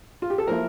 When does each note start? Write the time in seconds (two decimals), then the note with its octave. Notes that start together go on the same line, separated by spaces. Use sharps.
0.22 F4
0.30 G4
0.38 A4
0.48 F3 A#3 E4 A#4